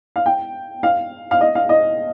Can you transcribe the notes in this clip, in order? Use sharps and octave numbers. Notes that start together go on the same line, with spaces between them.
F5
G5
F5
F5
D#5
F5
D#5